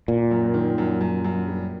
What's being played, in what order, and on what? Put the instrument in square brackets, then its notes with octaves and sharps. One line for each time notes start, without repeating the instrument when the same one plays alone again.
[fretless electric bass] A#2 [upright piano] A#3
[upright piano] F#2
D#3
F#2
F#2
F#2
G3